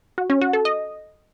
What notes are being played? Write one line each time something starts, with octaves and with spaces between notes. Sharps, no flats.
F#4
C#4
F#4
A4
D#5